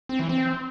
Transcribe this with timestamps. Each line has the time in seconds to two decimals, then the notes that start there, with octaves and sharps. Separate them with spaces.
0.09 C4
0.19 E3
0.29 C4